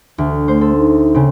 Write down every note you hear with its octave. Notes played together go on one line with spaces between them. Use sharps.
D2
A3 C5
A4
D#4
C#3 C4